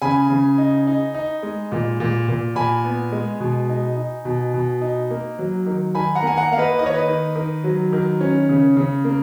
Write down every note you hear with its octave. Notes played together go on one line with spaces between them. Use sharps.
C#3 G#5 B5
C#3
D#4
D#4
D#4
G#3
A#2
A#2
A#2
A#2 G#5 B5
B3
G#3
B2
D#4
D#4
B2
B2
D#4
A#3
F#3
D#3
D#3 G#5 B5
F#5 A#5
A#3 G#5
F#5 A#5
A#3 F5
B4 D#5
D#3 D#5
C#5
B4 D#5
D#3
D#3
F#3
D#3
C#4
C#3
C#3
A#3